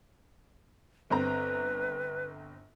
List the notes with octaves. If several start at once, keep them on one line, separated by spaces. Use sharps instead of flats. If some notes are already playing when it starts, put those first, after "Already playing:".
G1 C4 B4 A#5